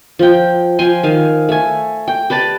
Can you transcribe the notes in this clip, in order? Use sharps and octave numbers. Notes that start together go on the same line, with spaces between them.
F3 G5
F3 G5 G#5 C6
D#3 F5 G#5
A3 G#5
G5
G4 B4 D5 A5